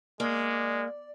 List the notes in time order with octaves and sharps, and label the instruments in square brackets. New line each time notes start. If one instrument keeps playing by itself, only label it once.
[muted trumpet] G#3 [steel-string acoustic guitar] A#3 [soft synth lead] D5